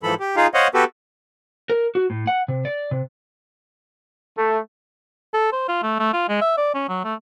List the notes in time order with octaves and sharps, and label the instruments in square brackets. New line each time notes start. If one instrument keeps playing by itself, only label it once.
[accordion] G#2 E3 F3 A4 B5
G4
D#4 F4 G#4 F5
C5 C#5 D#5 F5 F#5
B3 F#4 G4 A4 B4
[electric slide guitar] A#4
F#4
A2
F#5
C3
D5
C3
[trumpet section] A3
[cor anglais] A4
C5
F4
A3
A3
F4
G#3
E5
D5
C#4
F#3
A3